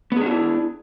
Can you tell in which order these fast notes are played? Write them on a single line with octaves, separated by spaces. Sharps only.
B3 G#4 D4 F#4 E4